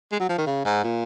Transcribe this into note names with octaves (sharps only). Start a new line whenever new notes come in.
G#3
F#3
F3
D#3
C#3
G#2
A#2